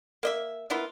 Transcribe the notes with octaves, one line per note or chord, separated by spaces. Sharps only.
A#3 D#5 E5
A#3 B3 E4 F4